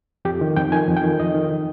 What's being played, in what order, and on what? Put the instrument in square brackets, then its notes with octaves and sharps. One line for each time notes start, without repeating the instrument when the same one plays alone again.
[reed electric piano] F2 G4
D#3
F2 G5
D#3 G#5
F2
G5
D#3
F2 D#5
D#3
D#3